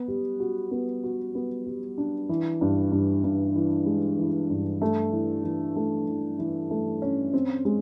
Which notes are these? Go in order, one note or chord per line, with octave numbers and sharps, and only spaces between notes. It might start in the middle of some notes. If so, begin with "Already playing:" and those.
Already playing: B3
G3
F#4
B3
F#4
B3
G3
D4
E3
G2
G2
G2
E3
G#3
E3
G2
A3
E3
E3
A3
E3
E3
A3
C#4
C4
G#3